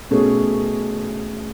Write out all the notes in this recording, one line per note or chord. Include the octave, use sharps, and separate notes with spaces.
B2 A3 C#4 G#4